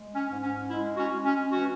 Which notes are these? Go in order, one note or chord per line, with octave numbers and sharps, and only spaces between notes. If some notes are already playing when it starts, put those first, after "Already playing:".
Already playing: G#3
C#4
G#2
C#4
G#3 E4
C#4 F#4
G#3
C#4
E3 C#4 F#4